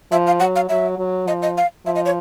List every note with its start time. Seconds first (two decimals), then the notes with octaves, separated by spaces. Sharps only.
0.12 F3 E5
0.26 F5
0.40 F#3 F#5
0.56 F5
0.69 F#3 E5
0.99 F#3
1.28 F3 D#5
1.42 D#5
1.57 F5
1.86 F3 E5
1.95 D#5
2.05 C#5